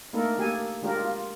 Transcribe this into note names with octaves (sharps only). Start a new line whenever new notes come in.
A3 A#3 D4 D#4 A4 A#4
A#3 G4 A4 G#5
G#3 D4 F4 G4 A#4
F4